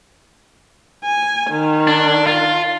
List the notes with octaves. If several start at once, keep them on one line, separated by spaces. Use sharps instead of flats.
G#5
D#3
D4
F4